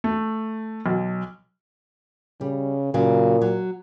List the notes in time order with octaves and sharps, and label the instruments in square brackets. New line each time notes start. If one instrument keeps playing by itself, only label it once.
[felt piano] A3
B1
[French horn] C#3 [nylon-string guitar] G3
[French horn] A#2 [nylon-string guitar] C#3 F#3
[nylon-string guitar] F#3